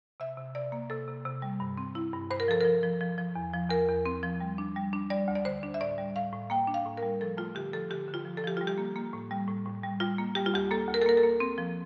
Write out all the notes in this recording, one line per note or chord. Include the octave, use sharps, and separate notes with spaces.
C3 E5
C3
C3 D5
A#3
C3 A4
C3
C3
G3
G2
C4
E4
G2
G2 C5
A#4
F3 A4
F3 A#4
F3
F3
F3
E2
F3
E2 A#4
E2
C4
F3
G3
D4
G3
D4
G3 D5
D2
D5
D3 C5
D4
E5
A2 D5
G3
A2 F5
A2
A#3 G5
D4
F5
A2
A#4
G3
F3 A4
A3 F4
D3 G4
F3 A4
D3 G4
D3
F4
F3
A4
F3 G4
G3 F4
G4
A#3
A#3
A2
G3
A2
A2
G3
G3 F4
A#3
G3 G4
F4
D2 G4
A#3 A4
D2
A#4
A4
A#3 A#4
A4
A#3
C4
F3